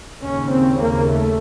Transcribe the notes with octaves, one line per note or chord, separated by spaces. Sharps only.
D#2 C#3 C#4
C4
A#3
A3